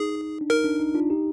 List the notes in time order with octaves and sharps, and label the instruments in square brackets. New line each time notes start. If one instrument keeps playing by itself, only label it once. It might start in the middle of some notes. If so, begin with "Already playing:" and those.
Already playing: [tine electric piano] D#4 [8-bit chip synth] G#4
[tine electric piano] D4
[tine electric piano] D#4 [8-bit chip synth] A#4
[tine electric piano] D4
D#4
D4 F4
D#4 G4